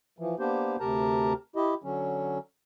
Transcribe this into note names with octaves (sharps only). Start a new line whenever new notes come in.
E3 F3
A#3 B3 D4 G4 C5
D2 C3 G4 A#4 A5 A#5
E4 G4 D#5
D3 F#3 C#4